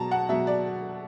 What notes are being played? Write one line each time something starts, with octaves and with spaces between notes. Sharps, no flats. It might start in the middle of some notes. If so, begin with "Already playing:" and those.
Already playing: B2 F#3 A5 A#5
F#5
B2 F#3 E5
D5